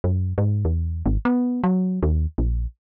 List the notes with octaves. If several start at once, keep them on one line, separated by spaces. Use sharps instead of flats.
F#2
G#2
E2
G#1
B3
F#3
D#2
A#1